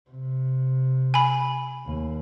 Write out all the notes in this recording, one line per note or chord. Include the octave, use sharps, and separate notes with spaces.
C3
G#5 B5
D#2 A#3